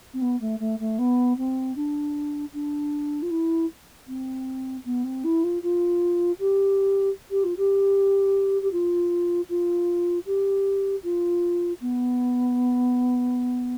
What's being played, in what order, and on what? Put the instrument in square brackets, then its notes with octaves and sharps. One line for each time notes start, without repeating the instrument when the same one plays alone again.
[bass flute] C4
B3
A3
A3
A3
B3
C4
D4
D4
F4
E4
C4
B3
C4
E4
F4
F4
G4
G4
F4
G4
G4
F4
F4
G4
F4
B3